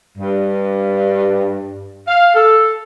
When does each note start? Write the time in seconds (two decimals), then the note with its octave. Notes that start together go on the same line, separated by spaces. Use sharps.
0.18 G2
2.08 F5
2.34 A4